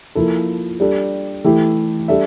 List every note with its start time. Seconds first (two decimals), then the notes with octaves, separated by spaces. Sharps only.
0.15 F3 A#3 E4 A4
0.80 G3 D4 A4
1.44 E3 A3 E4 G4
2.08 G3 D4 A4 E5